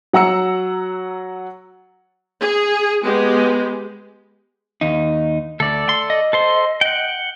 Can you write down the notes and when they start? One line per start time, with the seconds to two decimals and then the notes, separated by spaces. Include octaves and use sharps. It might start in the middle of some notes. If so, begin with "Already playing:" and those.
0.13 F#3 F#5 A#5 E6 C#7
2.40 G#4
3.04 G#3 B3 G4
4.81 D#2 D#4
5.60 D2 A4 D5
5.89 C6
6.10 D#5
6.33 A4 C5 C6
6.81 F#5 G5